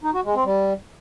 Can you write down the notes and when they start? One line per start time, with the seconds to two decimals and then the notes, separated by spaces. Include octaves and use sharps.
0.04 D#4
0.14 F#4
0.24 G#3
0.35 C4
0.45 G3